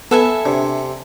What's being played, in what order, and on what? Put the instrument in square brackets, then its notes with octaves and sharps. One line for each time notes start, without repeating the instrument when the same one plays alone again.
[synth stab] B3 B4 [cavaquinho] A4 E5 G#5
[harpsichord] C3 [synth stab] D4